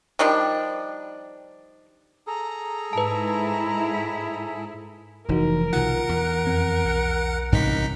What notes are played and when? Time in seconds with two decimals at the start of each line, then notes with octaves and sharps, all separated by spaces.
0.19 D#3 F3 G3 D4
2.27 G#4 A4 A#5
2.93 G#2 E4 B4 A5
5.29 F1 E3 D#4 F#4 A#4
5.73 B1 C3 D#3 F4 F#5
6.09 E2
6.45 F2 C4
6.85 B1 F#6 C#7
7.52 A1 G2 C3 G#3 D#4 B6